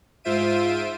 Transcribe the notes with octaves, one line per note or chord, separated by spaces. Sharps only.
G#2 F4 C5 E5 D7 D#7